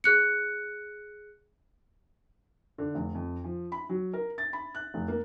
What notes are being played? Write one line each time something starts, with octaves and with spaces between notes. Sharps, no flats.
G#4 F#6 C#7
D3
F1
F2
F3
B5
F#3
A#4
A6
B5
F#6
F1
A#3